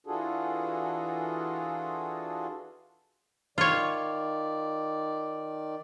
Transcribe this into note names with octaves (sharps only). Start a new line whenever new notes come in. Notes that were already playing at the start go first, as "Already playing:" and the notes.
E3 D4 F4 F#4 G#4 A4
D#3 F4 C#5 D5